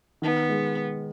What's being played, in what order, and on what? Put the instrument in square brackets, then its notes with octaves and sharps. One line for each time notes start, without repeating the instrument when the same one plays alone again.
[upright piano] D#3 [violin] B3
[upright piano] G#3